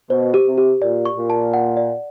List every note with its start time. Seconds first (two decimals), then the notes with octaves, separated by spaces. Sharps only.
0.10 B2 C5
0.34 G4
0.46 C3
0.58 G4
0.81 A#2 D5
1.05 C#6
1.17 A#2
1.30 A5
1.54 F#5
1.77 D5